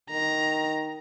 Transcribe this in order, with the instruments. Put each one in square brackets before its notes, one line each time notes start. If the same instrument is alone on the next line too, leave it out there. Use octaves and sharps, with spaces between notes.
[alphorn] D#3 [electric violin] A#5